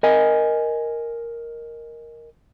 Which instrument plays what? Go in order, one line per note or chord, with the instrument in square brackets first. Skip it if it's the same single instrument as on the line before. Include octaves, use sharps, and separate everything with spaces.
[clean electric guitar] A#4 D#5 G#5